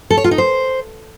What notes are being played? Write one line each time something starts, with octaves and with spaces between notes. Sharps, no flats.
A4
C#5
F4
D#4
C5